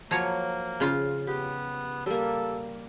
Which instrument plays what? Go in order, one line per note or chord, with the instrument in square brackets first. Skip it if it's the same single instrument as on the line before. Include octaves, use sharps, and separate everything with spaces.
[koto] F3 F#3 C#5 [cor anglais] A#3
[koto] C#3 F4
[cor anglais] B3 [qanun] G4
[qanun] G3 A#3 [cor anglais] A4